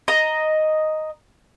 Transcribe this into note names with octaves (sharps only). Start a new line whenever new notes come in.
D#5 A#5